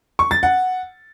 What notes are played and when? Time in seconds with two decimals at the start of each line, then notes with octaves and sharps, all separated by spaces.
0.19 C#6
0.31 A6
0.43 F#5